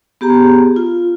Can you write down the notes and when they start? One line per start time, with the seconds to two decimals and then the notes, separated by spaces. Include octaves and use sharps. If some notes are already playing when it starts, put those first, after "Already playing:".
0.21 B3 G4 G#4 A#5
0.76 F4